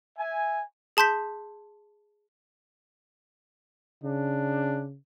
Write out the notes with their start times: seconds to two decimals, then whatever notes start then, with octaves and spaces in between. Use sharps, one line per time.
0.18 E5 G#5
0.97 G#4 A5 C6 G6 B6
4.04 C#3 D4